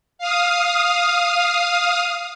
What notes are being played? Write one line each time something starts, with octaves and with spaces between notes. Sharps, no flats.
F5 D#6